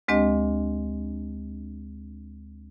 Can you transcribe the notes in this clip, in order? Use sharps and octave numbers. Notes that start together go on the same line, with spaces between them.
D2 G#3 C4 D4 G4 D#5